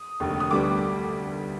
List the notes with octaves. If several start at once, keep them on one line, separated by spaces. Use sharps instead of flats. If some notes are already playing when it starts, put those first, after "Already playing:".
Already playing: D#6
F1 D#2 D3
D#6
D2 D3 G3 B3 D6